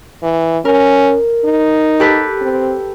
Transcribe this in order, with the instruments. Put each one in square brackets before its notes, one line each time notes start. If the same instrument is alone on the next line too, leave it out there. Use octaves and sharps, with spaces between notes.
[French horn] E3
[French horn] C#4 [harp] A#4
[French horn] D#4
[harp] G4 A4 B4
[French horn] C4